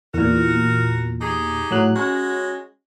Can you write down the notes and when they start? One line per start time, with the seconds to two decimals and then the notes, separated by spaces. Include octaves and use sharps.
0.14 E2 A#2 F#4 A#4
1.21 D#4 G4 G#4
1.71 A2 F#3 F#6
1.96 G#3 C#4 F#4